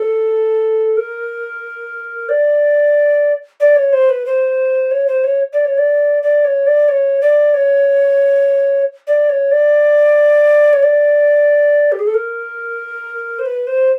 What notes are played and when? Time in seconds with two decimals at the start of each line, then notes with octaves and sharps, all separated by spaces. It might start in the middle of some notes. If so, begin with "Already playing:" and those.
Already playing: A4
0.97 A#4
2.29 D5
3.60 D5
3.76 C#5
3.93 C5
4.09 B4
4.26 C5
4.91 C#5
5.08 C5
5.24 C#5
5.53 D5
5.65 C#5
5.78 D5
6.23 D5
6.45 C#5
6.67 D5
6.89 C#5
7.21 D5
7.54 C#5
9.07 D5
9.29 C#5
9.51 D5
10.73 C#5
10.83 D5
11.92 G4
11.99 G#4
12.07 A4
12.14 A#4
13.39 C5
13.45 B4
13.67 C5